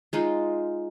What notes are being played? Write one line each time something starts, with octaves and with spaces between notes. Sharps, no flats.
G#3 D#4 F4